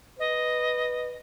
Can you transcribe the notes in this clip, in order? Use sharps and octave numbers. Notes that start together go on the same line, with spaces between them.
B4 D#5